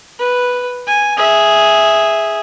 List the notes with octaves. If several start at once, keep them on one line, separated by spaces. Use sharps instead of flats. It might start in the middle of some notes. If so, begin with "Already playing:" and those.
B4
G#5
G#4 E5